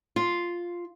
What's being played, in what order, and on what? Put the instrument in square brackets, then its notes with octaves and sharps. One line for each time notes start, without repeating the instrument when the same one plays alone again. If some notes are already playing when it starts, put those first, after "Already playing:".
[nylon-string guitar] F4